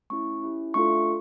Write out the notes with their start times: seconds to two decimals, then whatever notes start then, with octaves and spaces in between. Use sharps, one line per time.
0.10 A3 C#4 E4 C#6
0.42 C#4 E4 G4
0.74 A3 D4 F4 A4 C#6